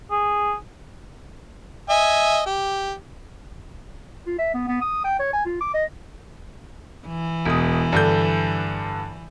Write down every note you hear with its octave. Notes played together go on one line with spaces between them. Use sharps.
G#4
D#5 E5 G#5
G4
F4
E5
B3
B3
D#6
G5
C#5
G#5
F4
D6
D#5
E3
E1 D#6
G2 D3 G6